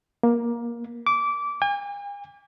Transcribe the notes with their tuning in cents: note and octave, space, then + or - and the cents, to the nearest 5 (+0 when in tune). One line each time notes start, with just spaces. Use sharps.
A#3 +20
D6 -20
G#5 -45